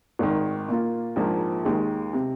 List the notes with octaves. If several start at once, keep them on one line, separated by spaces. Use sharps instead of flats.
G#1 G#2 D#3
A#2 A#3 F4
A#1 G#2 F3 A#3
D#2 D#3 G#3
C3